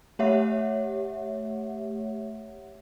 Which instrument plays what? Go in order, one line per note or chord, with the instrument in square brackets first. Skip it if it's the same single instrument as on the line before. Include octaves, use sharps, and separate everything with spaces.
[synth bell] A3 G4 C#5 E5 F#5